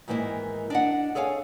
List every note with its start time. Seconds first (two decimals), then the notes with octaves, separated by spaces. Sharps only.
0.08 G#2 D#3 E3 A#3 E4
0.70 D4 D#5 F#5
1.15 G#4 A4 C#5 F5 G#5